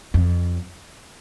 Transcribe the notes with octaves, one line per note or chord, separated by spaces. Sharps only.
F2